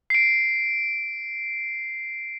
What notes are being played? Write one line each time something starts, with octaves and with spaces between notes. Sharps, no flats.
C7 D7